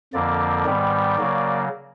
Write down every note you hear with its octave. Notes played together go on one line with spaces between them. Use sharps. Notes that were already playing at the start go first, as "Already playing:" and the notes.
F2 D3 F3 A#3 D5
G#2 D#3 G3 B3
C#3 F#3 A#3